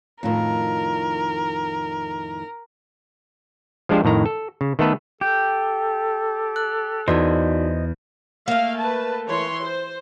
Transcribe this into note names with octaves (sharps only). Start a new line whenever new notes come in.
F2 A2 D#3 A#4
F3 G#3 D4 G4 C5
F2 A2 D#3 A#5
A4
C#3
D#3 A3 B3 A4 B4
G4 A4 G6
F#6
E2 D#4 F#4 C5 D5 D#5 C6
A3 A#3 F5
B4 A5
E3 C#5 C6
C5